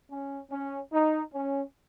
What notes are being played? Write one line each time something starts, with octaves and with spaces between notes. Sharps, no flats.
C#4
C#4
D#4
C#4